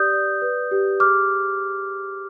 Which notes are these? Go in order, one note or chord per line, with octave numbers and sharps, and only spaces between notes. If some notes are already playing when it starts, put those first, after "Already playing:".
Already playing: G4 B4 D5 D#6 G6
D5
B4
G4
G#4 D6 F6